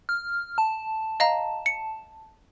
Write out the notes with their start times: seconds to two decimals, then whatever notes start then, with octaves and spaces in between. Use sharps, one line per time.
0.09 F6
0.58 A5
1.20 D#5 F5 A#5
1.66 C#7